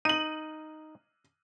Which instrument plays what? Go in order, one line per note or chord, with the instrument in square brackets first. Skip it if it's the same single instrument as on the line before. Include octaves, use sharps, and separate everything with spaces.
[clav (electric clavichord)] D#4 [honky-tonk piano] D#7 F#7